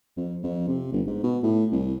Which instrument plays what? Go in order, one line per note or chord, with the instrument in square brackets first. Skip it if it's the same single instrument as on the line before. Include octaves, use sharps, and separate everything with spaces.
[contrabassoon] F2
F2
C3
G1
G#2
B2
A2
C2